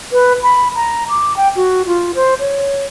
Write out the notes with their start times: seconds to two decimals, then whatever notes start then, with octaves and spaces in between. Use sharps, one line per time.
0.12 B4
0.43 B5
0.75 A#5
1.09 D6
1.37 G5
1.56 F#4
1.86 F4
2.15 C5
2.40 C#5